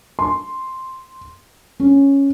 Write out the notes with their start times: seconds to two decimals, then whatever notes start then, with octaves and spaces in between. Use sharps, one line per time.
0.19 C6
1.80 C#4